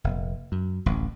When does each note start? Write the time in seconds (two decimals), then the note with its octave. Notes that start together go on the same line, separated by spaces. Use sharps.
0.04 F1 A#2
0.52 F#2
0.86 D1 A1